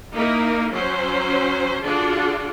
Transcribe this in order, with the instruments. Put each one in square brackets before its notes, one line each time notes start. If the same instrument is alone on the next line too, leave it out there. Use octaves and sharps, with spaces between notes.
[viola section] A#3 D#4 E4 A#4
F#3 C#4 C5
D3 D4 F4 F#4 G#4 F#5